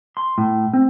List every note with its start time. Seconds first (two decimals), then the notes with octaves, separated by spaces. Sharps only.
0.17 C6
0.38 A2
0.73 C4